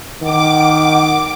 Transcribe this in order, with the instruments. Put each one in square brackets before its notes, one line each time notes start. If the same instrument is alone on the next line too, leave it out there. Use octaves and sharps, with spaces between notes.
[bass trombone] D#3 [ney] F#5 [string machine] D6